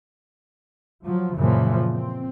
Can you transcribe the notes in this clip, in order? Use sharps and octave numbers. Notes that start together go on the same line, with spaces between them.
F3 F#3
F#2 A#2 C#3 E3 F3
C4